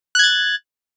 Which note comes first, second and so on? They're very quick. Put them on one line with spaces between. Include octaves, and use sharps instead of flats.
F#6 G#6 A6